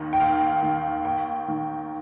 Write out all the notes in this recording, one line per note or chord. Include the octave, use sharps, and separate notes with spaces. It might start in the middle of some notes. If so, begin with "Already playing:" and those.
Already playing: D#2 D#3
G5
D#2 F5
D#3
D#2 G5
D#3